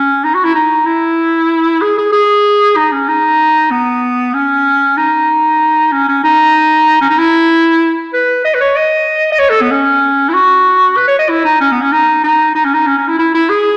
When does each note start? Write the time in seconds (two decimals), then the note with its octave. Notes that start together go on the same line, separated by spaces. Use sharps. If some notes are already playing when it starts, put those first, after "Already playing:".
Already playing: C#4
0.24 D#4
0.34 F#4
0.45 E4
0.55 D#4
0.86 E4
1.81 G#4
1.98 G#4
2.12 G#4
2.76 D#4
2.93 C#4
3.08 D#4
3.71 B3
4.34 C#4
4.97 D#4
5.92 C#4
6.08 C#4
6.24 D#4
7.01 C#4
7.10 D#4
7.18 E4
8.14 B4
8.45 D#5
8.54 B4
8.61 C#5
8.76 D#5
9.32 D#5
9.39 C#5
9.49 A4
9.61 B3
9.71 C#4
10.29 E4
10.34 F#4
10.97 B4
11.07 C#5
11.19 D#5
11.29 E4
11.45 D#4
11.61 C#4
11.72 B3
11.82 C#4
11.92 D#4
12.24 D#4
12.55 D#4
12.65 C#4
12.74 D#4
12.87 C#4
12.98 C#4
13.08 E4
13.19 E4
13.34 E4
13.49 G#4